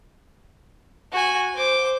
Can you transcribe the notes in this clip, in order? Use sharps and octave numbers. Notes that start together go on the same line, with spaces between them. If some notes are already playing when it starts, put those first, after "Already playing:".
F#4 G#5
C5 D6